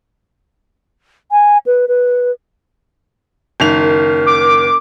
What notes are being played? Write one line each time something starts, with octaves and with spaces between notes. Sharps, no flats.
G#5
B4
B4
F#1 D#3 F7
A#4
D6